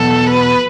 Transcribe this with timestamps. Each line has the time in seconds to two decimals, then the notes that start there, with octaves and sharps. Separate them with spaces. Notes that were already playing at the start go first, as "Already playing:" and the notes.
Already playing: E2 B2 F#3 B3 A4
0.27 B4